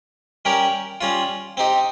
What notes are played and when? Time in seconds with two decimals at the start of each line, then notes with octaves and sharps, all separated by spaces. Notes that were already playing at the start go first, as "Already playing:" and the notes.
0.45 G3 C#4 G4 A#4
1.01 G3 C#4 F4
1.57 C4 D#4 G4